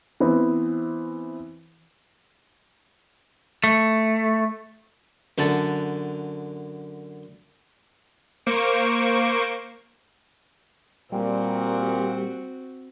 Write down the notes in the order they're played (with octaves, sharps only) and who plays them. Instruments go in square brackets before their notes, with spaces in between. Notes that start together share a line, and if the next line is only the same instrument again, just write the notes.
[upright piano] E3 B3 C4
[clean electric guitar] A3
[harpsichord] F#2 D3 F#5 A5
[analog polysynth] A#3 C5 C#6 D7
[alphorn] A#2 [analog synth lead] G3 [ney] A#3 [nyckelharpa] C4 F#4